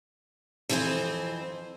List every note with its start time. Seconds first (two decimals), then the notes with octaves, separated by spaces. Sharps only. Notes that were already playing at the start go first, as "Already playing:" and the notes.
0.69 F2 E3 C4 D4 C5 G#5